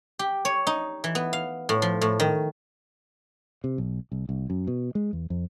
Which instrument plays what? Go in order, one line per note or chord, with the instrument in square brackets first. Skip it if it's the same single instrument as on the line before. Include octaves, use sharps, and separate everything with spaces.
[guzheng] G4
C#5
D#4
E3
B3
F5
A2
F3
A2
D#3
[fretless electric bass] C3
B1
C2
C2
F#2
B2
G#3
E2
F2